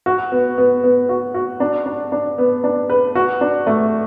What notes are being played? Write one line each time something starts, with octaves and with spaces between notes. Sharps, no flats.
F#4
B3
B3
B3
F#4
F#4
D4
D4
D4
B3
D4
B4
F#4
D4
A3